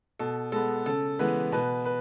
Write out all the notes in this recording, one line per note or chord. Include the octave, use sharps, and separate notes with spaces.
B2 A4
G#3 B3 A4
C#3 A4
E3 G#3 B3 B4
B2 B4
B4